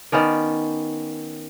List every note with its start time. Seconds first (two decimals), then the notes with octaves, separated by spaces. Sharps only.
0.12 D#3 B3 C#4 D5